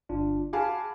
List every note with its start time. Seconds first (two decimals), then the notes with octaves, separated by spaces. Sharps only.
0.09 G1 D4 F4
0.53 F#4 G#4 F5 A5 B5 D6